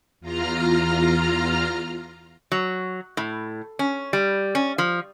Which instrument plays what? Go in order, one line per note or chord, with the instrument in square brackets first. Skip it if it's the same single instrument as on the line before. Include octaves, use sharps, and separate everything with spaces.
[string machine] E2 F4 A#5 F6
[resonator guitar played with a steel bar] F#3
A2
C#4
G3
C#4
F3